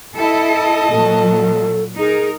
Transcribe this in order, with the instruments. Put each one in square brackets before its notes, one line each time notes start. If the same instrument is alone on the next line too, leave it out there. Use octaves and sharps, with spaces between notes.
[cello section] E4 A4 [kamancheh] D#5 A5
[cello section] A#2 F#3 [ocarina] A4
[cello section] D#4 A#4 [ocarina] G#4